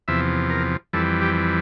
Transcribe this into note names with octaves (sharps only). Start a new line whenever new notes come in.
E2 C3 F3 E5
A#4
F2 E3 G3 A4
G4